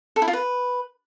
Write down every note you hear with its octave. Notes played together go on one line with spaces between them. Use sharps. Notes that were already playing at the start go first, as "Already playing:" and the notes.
A4
E4
F4
B4